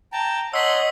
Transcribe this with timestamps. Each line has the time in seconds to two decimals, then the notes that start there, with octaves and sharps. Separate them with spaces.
0.13 G5 A5 A#5
0.53 C#5 D#5 F#5 C6 E6 B6 F#7